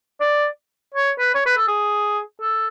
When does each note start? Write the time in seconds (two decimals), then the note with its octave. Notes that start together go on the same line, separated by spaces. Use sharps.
0.21 D5
0.94 C#5
1.19 B4
1.35 C#5
1.46 B4
1.57 A4
1.68 G#4
2.41 A4